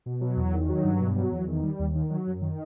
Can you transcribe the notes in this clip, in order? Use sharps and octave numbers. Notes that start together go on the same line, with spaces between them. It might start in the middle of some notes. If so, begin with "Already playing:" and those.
B2
F#3
E2
D#3
F#3
G2
B2
F#3
E2
D#3
G3
D#2
D#3
F#3
F#2
D#3